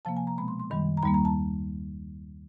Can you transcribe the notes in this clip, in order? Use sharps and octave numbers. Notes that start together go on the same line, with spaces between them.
C3 F3 A#3 A5
G#5
A#5
B2 G#3 B3 B5
C6
C6
F#2 D#3 G3 B5
A#5
D#2 D#3 G3 A#3 B5
A#5
A5